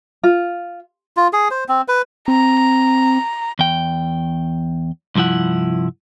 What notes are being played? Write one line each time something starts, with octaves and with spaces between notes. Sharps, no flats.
F4
F4
G#4
C5
C4
B4
C4 A#5
E2 G5
C2 G2 F3 E4 F#5